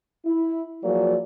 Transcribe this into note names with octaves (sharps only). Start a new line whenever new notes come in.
E4
F3 F#3 A#3 F#4 G#4 D5